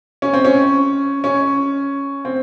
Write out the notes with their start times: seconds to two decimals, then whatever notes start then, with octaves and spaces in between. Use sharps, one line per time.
0.22 C#4
0.33 C4
0.45 C#4
1.24 C#4
2.25 C4